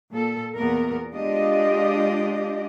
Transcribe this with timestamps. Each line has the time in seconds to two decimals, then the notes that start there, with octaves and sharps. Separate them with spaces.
0.12 A#2 A4
0.56 E2 A#2 B3 A#4
1.12 G#3 D4 F4 G4 D5 D#5